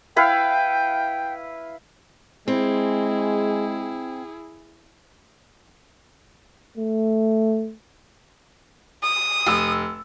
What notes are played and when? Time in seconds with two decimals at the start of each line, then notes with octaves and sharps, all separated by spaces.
0.16 E4 B4 F5 G5
2.48 G#3 C4 E4 G#4
6.77 A3
9.03 D#6
9.47 F1 E6